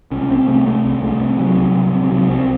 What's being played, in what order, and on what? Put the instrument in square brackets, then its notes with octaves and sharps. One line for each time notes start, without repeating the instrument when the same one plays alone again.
[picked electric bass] C2 C#4
C2 C4
C3 A3
C3 A3
C2
C2 A3
C3
C3 F#3
C2
C2
C3
C3 F#3
C2 C4